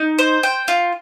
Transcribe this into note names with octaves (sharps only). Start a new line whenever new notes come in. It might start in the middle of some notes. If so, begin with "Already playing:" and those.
Already playing: D#4
C5
G5
F4